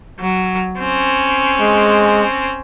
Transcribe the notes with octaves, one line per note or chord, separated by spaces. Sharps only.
F#3
C4 C#4
G#3